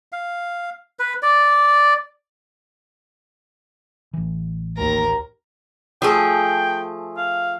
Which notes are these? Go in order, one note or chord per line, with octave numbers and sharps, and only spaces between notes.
F5
B4
D5
A1 E3
D#2 A#4 A#5
F3 A3 G#4 G5
F5